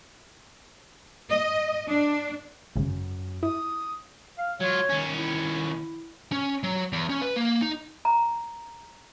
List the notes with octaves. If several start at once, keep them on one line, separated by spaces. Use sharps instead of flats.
D#5
D4
G#1 F#2 C#3
E4 D#6
F5
F#3 F4 C#5
D#2 C#4
E4
C#4
F#3
E2
C#4
B4
A#3
D#4
A#5